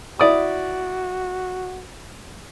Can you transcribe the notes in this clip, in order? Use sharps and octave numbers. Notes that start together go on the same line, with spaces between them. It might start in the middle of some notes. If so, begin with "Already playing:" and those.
E4 F#4 D5 D#6